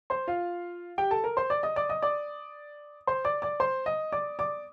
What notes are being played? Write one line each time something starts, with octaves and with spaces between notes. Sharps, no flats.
C5 C6
F4 F5
G4 G5
A4 A5
A#4 A#5
C5 C6
D5 D6
D#5 D#6
D5 D6
D#5 D#6
D5 D6
C5 C6
D5 D6
D5 D6
C5 C6
D#5 D#6
D5 D6
D5 D6